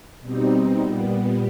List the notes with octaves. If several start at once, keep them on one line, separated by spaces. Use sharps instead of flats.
B2 G3 C4 D#4
A#2 G3 B3